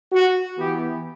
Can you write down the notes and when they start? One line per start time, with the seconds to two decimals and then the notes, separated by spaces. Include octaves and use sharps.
0.11 F#4
0.57 E3 B3 G4